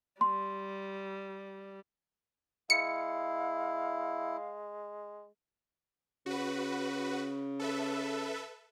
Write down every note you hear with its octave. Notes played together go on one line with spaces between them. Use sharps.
G3 C6
G#3 E4 F5 C#7
C#3 F#4 B4
A4 B4 E5